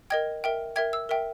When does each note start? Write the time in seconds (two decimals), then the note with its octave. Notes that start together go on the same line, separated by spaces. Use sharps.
0.10 A#4 D#5 G5 G#6
0.44 A#4 E5 G5
0.76 A#4 E5 G5 G#6
0.93 E6
1.09 A#4 E5 G5